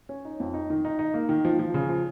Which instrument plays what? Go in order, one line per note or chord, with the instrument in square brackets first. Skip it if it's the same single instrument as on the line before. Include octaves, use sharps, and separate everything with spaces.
[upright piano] C#4
D#4
F2
D#4
D#3
D#4
D#4
A#3
D#3
F3
F3
C#3
F3